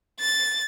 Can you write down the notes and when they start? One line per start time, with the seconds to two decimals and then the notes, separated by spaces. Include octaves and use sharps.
0.20 A6